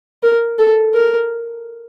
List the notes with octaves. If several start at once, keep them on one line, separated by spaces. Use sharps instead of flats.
A#4
A4
A#4